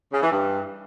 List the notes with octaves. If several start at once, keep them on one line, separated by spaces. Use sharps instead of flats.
C#3
E3
G2